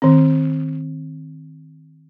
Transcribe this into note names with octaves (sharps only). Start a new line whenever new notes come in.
D#3 C4